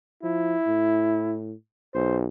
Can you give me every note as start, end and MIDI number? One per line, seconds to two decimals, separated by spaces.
0.23 0.55 53
0.23 1.38 64
0.67 1.54 45
1.94 2.27 35
1.94 2.19 72